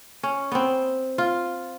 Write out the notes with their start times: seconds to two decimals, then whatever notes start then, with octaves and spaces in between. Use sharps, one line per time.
0.23 C#4
0.52 B3 C4
1.18 F4